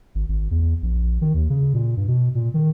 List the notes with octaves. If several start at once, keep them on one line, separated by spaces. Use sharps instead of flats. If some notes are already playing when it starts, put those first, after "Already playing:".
G#1
G#1
E2
A#1
D#3
D#2
C#3
A#2
G2
B2
A#2
D#3